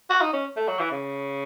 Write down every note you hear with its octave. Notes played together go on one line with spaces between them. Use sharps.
F#4
D#4
C#4
A3
F#3
E3
C#3